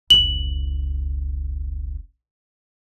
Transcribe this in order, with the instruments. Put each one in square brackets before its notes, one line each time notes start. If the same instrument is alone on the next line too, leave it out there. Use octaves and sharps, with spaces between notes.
[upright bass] F1 C#2 [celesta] F#7